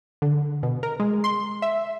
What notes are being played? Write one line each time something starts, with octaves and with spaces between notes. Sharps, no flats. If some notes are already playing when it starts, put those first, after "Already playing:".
D3
B2
A#4
G#3
C6
E5